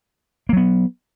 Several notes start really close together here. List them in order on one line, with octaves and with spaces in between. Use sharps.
A#3 F#3 B3